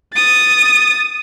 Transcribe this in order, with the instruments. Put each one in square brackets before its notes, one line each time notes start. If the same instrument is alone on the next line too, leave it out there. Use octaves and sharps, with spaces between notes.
[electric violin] D#6 A6